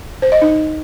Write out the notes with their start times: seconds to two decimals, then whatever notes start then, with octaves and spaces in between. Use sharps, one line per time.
0.22 C5
0.32 D#5
0.42 D#4